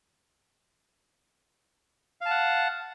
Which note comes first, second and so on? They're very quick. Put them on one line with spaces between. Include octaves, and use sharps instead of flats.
F5 A5 F#5